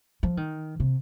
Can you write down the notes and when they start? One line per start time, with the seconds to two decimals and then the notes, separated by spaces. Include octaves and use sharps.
0.23 F3
0.37 D#3
0.80 C3